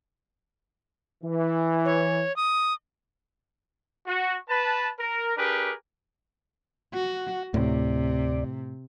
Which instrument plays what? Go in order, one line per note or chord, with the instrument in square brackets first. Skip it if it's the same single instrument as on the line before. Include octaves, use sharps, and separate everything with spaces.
[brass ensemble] E3
[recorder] C#5
D#6
[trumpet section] F#4
B4 A5
A#4
D4 G4 G#4 A#4 B4
[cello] F#4 [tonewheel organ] F#5
[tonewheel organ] D2 D5 [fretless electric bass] A2 [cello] C3